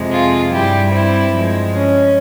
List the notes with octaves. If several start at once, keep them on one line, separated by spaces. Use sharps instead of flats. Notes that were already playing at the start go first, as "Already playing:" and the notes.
Already playing: F2 C3 F3 G#3
F4 G#4
G2 G3 E4 G4
C4 E4
G2 F3 G#3
C#4